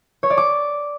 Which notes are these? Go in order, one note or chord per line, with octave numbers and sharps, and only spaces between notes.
C#5
D5
D6